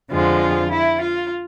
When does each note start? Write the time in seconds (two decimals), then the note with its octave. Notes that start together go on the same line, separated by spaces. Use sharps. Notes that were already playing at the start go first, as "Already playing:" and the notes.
0.10 F2 D3 F3 G#3 F4
0.71 E4
1.01 F4